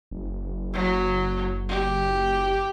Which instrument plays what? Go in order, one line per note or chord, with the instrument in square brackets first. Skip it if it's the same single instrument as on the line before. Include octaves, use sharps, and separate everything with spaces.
[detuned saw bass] F#1
[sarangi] F#3
G4